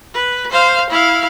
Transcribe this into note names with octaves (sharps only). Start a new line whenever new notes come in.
B4
C5 F5
E4 F5